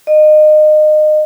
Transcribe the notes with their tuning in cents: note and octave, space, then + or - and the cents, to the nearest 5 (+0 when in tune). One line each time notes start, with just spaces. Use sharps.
D#5 -30